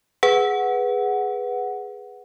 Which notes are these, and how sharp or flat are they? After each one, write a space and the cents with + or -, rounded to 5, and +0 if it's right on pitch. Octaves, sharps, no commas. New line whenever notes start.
G#4 +0 B4 +0 F#5 +0